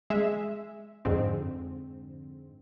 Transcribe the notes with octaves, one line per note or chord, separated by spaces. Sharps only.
G#3 E5
F2 G#2 D3 C4